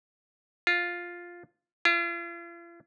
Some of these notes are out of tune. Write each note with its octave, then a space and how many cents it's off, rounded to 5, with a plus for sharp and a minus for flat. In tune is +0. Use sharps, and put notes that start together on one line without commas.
F4 +5
F4 -40